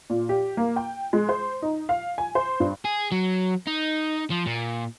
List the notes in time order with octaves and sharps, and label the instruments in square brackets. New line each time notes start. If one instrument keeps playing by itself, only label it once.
[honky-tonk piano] A#2
G4
A#3
G5
G#3
C5
D#4
F5
G#5
C5
G2
[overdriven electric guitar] G#4
F#3
D#4
F3
A#2